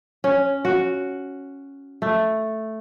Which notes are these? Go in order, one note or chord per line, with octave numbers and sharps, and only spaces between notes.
C#4
F#4
A3